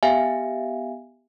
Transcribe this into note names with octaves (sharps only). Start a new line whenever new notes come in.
B3 G4 E5 F5 G#5